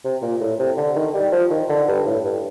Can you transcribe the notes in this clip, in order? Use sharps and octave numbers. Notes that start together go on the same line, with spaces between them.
C3
A#2
A2
C3
D3
D#3
G3
F3
D#3
D3
G2
A2
G2